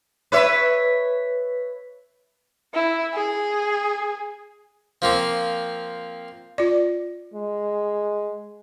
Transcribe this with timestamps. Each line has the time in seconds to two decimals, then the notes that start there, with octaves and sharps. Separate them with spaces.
0.32 B4 C#5 E5
2.74 E4
3.14 G#4
5.02 F3 A#3 C4
6.58 F4 D5
7.34 G#3